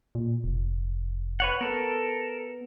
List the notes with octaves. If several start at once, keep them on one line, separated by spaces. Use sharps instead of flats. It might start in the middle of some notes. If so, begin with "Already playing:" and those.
A#2
F1
B4 C#5 F#5
B3 A4 A#4